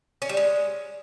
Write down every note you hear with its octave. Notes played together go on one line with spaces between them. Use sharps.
C#4
G3
G#3